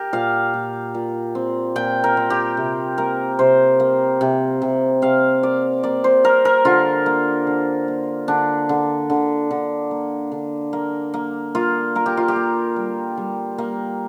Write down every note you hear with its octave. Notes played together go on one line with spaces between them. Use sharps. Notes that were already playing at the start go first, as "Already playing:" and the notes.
Already playing: G4 A#4
A#2 F5
A#2
A#2
C4
A#2 G5
A#4
C4
G4
C3
A#3 A#4
C3 C5
A#3
C3
C3
C3 F5
A#3 D5
A#3 D5
C5
A#3 A#4
A#4
D3 F4
A#3
D3
A#3
D3 D4
D3
D3
D3
A#3
D3
A#3
A#3
A#3 F4
A#3 A#4
G4
F4
G4
A#3
G3
G3
A#3